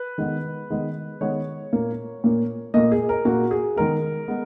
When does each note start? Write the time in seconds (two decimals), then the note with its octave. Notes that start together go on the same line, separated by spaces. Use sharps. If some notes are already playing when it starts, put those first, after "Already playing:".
Already playing: B4
0.18 D#3 G#3 B3
0.70 D#3 G#3 B3
1.21 D#3 G#3 B3 C#5
1.73 A#2 A#3
2.24 A#2 A#3
2.74 A#2 A#3 D#5
2.92 G#4
3.09 A#4
3.25 A#2 A#3 F#4
3.51 G#4
3.76 D#3 G#3 B3 A#4
4.28 G#3 B3